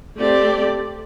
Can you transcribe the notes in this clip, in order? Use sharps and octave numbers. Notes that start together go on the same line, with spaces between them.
A3 C4 G4 D5